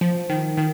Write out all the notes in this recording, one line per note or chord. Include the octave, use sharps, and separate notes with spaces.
F3
D#3
D#3